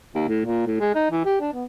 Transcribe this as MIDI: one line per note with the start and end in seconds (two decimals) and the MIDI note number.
0.15 0.23 39
0.28 0.40 45
0.45 0.66 46
0.67 0.76 45
0.80 0.92 56
0.95 1.09 63
1.11 1.23 52
1.25 1.39 67
1.41 1.51 62
1.53 1.65 59